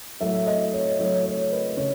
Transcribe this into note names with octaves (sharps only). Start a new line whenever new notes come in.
A2 F#3 A3 E5
D#5
C#5
A2 F#3 A3 C#5
C#5
B4
C#3 C#5